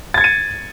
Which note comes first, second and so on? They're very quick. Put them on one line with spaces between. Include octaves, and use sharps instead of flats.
A6 G#6 C#7 D#7